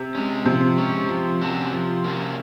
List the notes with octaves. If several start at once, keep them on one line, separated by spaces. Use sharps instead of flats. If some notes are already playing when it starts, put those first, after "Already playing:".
Already playing: C3
G#3 C#4
C3 F3
G#3 C#4
F3
A#3 C#4 F#4 A4
F3
A#3 C#4 F#4 A4